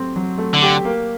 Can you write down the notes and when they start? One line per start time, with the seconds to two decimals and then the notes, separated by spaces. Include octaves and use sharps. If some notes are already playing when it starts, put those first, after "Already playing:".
Already playing: F#3 A3 C4 G4
0.16 F#3
0.38 A3
0.54 D3
0.62 G4
0.85 A#3